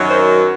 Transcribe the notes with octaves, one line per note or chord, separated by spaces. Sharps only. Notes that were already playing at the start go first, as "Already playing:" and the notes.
Already playing: F#2 D#3 F#3
C5